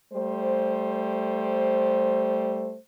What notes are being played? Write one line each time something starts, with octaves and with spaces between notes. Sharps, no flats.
G3 A3 C5